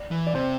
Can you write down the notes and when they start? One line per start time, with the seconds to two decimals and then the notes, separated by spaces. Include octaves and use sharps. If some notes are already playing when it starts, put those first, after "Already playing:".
Already playing: D5
0.11 E3
0.27 D5
0.35 C3 C5